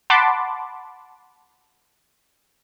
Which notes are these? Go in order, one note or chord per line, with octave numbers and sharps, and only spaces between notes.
F#5 A5 B5 C6 D6